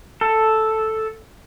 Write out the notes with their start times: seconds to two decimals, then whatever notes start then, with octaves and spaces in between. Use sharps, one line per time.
0.21 A4